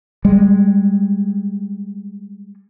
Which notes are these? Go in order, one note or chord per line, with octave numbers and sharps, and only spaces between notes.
G3 G#3